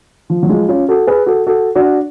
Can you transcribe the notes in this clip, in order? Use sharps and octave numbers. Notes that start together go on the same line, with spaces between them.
F3
F#3
F3 G#3
C#4 F4
F#4 A4
G#4 B4
F#4 A4
F#4 A4
D4 F#4